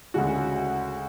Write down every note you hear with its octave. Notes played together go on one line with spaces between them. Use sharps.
D2 C#3 G#3 F#4